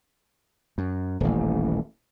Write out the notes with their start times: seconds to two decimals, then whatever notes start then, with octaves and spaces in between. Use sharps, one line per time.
0.78 F#2
1.20 D#1 A1